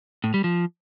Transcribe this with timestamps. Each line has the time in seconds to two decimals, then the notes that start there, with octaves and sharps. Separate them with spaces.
0.24 A2
0.34 G3
0.44 F3